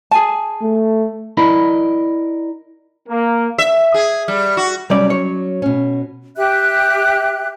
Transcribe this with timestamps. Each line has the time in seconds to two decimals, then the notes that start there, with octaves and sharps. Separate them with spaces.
0.11 G#4 G#5 A5
0.62 A3
1.37 E4 A#4 D5 D#5 B5
3.09 A#3
3.58 E5
3.94 G#4
4.28 G3
4.57 F#4
4.90 C2 F#3 G3 C#4 D5
5.10 C#5
5.62 B2 C#4
6.36 G4 E5 F#6